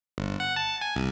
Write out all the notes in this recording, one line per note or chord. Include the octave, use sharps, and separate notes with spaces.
G1
F#5
A5
G#5
C2